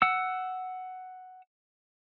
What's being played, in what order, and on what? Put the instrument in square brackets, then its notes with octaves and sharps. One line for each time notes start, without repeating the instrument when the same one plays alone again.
[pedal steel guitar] F#5 E6